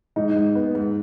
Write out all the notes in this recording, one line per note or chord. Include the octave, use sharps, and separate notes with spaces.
G#2 D#4
G#2
B3
G#2